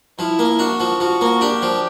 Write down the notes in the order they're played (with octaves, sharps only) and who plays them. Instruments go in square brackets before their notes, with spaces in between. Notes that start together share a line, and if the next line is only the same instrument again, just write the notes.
[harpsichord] F3 [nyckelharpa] E4
[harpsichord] A#3
[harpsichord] D4 [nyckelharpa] F#4
[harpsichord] F3
[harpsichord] F3 [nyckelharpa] F#4
[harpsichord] A#3
[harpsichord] D4 [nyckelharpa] G4
[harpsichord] F3